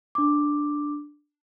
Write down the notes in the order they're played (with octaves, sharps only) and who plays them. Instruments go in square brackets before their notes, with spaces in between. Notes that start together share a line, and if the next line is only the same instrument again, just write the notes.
[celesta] D4 D6